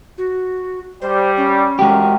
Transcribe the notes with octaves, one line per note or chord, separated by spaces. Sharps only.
F#4
G3 C5
C#4
F2 A2 G#3 F#4 G4 A#4